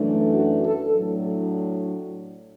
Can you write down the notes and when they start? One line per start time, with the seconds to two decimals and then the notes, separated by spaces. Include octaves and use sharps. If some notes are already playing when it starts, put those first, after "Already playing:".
Already playing: F#2 E3 A3 D4
0.32 F#4
0.64 A4
0.96 A2 F#3 D4